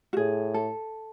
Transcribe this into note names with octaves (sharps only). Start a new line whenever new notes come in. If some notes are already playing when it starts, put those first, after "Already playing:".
F#4
A2 G#4
A4